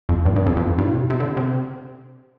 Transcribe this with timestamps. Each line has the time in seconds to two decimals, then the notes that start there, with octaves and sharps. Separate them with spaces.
0.09 F2
0.25 G2
0.36 G2
0.46 F2
0.57 F2
0.78 G2
0.84 A2
0.89 B2
0.94 C3
1.00 B2
1.10 C3
1.20 D3
1.37 C3